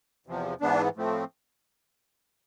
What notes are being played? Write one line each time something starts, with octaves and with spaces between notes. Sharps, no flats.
E2 C3 F3
G#2 E3 B3 D4
A2 F3 A3 C4